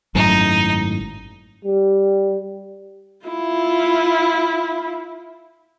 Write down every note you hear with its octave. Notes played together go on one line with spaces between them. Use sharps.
G#1 F#2 A2 D#4
G3
E4 F4